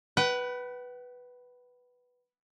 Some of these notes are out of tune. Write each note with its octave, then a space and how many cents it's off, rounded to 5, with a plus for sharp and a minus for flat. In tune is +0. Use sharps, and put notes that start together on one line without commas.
B4 +0 F#5 +45